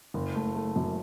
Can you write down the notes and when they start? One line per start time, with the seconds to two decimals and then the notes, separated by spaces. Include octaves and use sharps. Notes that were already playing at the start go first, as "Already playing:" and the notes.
0.14 F#1
0.35 A3
0.55 A3
0.76 F#2